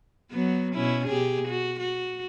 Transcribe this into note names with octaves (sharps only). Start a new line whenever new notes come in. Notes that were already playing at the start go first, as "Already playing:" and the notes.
F#3 B3
B2 C#4 E4
B2 G4 G#4
F#4
F#4